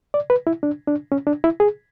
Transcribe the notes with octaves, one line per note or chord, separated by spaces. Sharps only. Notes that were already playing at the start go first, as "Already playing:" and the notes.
D5
B4
E4
D4
D4
C#4
D4
E4
G#4